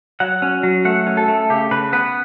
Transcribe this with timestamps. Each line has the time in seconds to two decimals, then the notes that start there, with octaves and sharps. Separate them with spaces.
0.20 F#3 F#5
0.42 C#4
0.63 F#3
0.85 A3 F#5
1.07 C#4
1.17 A4
1.28 A3
1.50 C#3 G4
1.71 C#3 B4
1.92 B3 B4